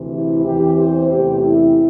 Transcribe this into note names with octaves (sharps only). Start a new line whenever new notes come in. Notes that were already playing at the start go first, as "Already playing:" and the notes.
Already playing: D2 C3 E3
E4
E2 E3 C4 G4
C5
E2 C3 A3 G4
E4